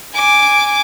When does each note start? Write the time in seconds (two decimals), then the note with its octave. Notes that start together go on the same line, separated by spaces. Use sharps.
0.14 G#5 D6